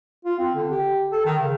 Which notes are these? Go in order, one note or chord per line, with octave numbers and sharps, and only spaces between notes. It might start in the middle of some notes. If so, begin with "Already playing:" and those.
F4
C4
D3
G4
A4
D#3
C#3